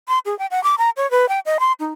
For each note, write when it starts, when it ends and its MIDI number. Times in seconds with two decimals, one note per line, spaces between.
0.08 0.19 84
0.26 0.37 68
0.39 0.46 79
0.51 0.63 78
0.64 0.75 86
0.78 0.90 82
0.97 1.09 73
1.11 1.29 71
1.29 1.40 79
1.46 1.58 75
1.60 1.72 84
1.80 1.93 63